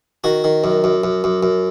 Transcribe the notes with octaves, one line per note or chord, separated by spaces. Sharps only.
D#3 F#4
D#3
F#2
F#2
F#2
F#2
F#2